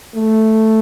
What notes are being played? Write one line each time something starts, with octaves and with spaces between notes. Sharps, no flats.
A3